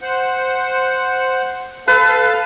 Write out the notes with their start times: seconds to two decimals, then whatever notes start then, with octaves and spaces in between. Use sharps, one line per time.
0.01 C5 F#5
1.88 A4 B4 F5 A5